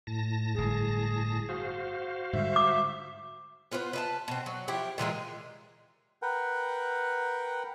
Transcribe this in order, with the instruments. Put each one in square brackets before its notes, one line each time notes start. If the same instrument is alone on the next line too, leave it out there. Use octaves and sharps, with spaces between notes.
[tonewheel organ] A2 A5 A#6
[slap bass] G1 G#2 [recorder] G#4
[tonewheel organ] F#4 C5 F5
[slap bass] G#2 D3 G3 [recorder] E5
[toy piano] D6
[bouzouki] B3 F4 B4 C5
B4 E5 A5
B2 C4
F#3
F3 E4 G4
A#2 E3 G#3 F4
[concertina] A#4 B4 F#5 G5